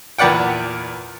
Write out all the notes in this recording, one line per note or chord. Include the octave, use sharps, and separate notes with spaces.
E2 A#2 B4 D5 F#5 G5